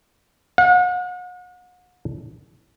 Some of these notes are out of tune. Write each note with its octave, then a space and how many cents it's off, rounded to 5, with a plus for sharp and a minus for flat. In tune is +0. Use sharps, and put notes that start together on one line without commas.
F#5 -40